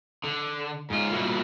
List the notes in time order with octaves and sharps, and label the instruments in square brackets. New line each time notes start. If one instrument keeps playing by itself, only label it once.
[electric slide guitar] D3
G#2 F4
A#2 G3 A#3 E4 F#4